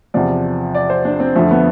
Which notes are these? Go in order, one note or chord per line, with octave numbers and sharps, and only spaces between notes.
E2 C3 F3 D5
D5
C5
D4
C4
F2 D3 F3 A3
B3